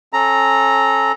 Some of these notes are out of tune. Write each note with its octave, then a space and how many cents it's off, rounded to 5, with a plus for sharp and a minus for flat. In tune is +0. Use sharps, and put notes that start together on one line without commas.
C#4 -30 A4 -20 A#5 +0